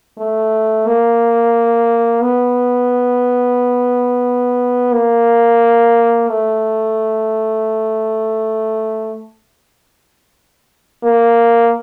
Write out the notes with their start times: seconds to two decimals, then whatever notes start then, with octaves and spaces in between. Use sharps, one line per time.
0.18 A3
0.86 A#3
2.21 B3
4.93 A#3
6.29 A3
11.04 A#3